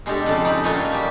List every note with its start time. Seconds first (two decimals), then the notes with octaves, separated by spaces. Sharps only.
0.06 B2 G#3 D4 G4 A4
0.26 F2 C#3 C4 A4 A5
0.45 D#4 G5 B5
0.64 A#2 D#3 C#4 F4 F#4 A4
0.92 G3 G4